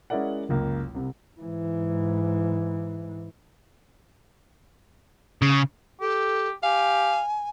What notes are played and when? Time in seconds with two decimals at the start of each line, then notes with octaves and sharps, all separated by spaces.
0.10 G#3 C#4 E4 A#4 D5 F#5
0.49 F#1 C#2 A#3
0.94 C2 C3
1.40 G#2 E3
5.42 C#3
6.01 G4 A4
6.63 G4 F5 G#5